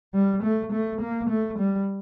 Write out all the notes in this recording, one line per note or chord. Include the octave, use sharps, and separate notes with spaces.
G3
A3
A3
A#3
A3
G3